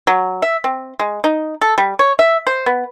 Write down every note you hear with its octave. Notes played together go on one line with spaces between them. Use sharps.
F#3
E5
C4
G#3
D#4
A4
G3
C#5
E5
C5
B3